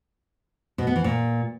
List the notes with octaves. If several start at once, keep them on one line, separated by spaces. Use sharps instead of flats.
B2
B3
E3
A#2